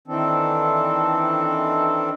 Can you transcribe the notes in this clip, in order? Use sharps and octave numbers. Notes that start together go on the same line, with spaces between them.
D#3 E3 C4 D4 A4